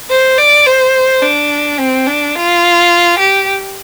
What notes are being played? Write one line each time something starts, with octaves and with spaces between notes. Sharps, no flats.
C5
D5
C5
D4
C4
D4
F4
G4